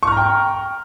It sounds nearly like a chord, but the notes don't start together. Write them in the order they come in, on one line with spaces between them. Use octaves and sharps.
C#6 F6 A#5 G5